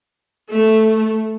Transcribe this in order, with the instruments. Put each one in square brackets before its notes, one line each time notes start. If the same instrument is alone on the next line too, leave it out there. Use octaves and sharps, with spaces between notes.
[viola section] A3